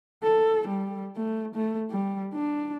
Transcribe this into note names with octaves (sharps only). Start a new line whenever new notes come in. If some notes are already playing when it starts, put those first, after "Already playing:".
A4
G3
A3
A3
G3
D4